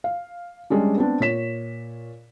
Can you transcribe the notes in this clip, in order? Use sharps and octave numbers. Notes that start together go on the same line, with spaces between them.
F5
G3 G#3 C#4 D4
B3 C4 D4
A#2 C#5 B6 E7